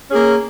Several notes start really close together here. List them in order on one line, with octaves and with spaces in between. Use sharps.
C#4 G#4 A#3